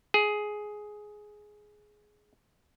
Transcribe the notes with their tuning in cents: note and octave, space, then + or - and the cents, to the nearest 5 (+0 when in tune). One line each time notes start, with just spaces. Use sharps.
G#4 +10